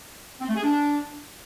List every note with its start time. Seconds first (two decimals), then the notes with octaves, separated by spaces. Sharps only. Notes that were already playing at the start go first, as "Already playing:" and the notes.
0.41 C4
0.48 A3
0.56 G#4
0.63 D4